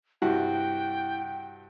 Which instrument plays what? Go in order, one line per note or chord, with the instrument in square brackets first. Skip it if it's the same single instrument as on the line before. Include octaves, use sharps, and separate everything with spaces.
[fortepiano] G2 C3 F#4 [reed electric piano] E4 [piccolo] G5